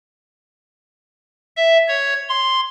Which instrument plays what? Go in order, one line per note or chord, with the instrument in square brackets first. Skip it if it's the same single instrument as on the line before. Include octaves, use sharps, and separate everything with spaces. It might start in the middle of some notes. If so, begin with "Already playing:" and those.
[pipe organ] E5
C#5
C6